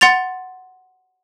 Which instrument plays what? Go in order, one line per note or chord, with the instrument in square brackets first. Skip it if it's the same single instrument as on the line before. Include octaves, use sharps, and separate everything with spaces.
[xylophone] F#5 C6 A6 F7